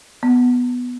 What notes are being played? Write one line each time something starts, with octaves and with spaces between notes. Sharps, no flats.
B3